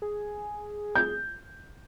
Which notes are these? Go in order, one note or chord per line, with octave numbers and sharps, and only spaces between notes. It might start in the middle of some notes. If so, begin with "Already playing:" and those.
G#4
G6